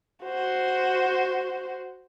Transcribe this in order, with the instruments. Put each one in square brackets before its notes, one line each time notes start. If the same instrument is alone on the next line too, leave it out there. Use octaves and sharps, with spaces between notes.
[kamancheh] F#4 C5